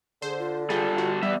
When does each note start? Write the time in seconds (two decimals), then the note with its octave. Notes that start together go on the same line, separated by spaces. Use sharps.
0.22 D3 G#4 C5
0.39 F4
0.70 G3 F4 G#4 A4
0.98 F#4
1.23 G3 B3 D5 E5